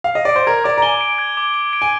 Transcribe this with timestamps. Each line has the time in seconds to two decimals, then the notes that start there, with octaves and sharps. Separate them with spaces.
0.04 F5
0.15 D#5
0.25 D5 D7
0.36 C5
0.47 A#4 G#6
0.64 D5 D6
0.78 A#5
0.82 G#5 G7
1.01 D7
1.18 G#6
1.37 D6
1.54 G7
1.73 D7
1.82 G#5